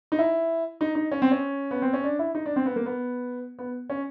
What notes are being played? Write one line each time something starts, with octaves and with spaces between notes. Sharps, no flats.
D#4
E4
D#4
D#4
C#4
C4
C#4
B3
C4
C#4
D4
E4
D#4
D4
C4
B3
A#3
B3
B3
C#4